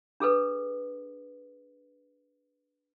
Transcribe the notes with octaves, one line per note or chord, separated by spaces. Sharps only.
D4 G#4 A4 B4